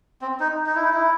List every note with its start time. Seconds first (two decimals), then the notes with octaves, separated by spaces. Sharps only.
0.22 C4
0.40 D#4
0.66 D#4
0.75 E4
0.85 D#4
0.94 E4